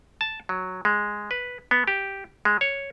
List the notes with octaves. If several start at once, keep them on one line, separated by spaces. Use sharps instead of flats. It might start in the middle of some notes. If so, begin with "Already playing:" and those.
A5
F#3
G#3
B4
B3
G4
G#3
C#5